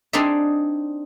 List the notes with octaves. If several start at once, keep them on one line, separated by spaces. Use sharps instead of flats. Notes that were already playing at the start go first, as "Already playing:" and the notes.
C4 D4 D#4 G#4 D5 E5